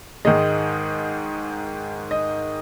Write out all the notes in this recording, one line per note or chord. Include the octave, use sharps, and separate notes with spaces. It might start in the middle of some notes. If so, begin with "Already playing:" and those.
G#2 D#3 G#3 D#5
D#5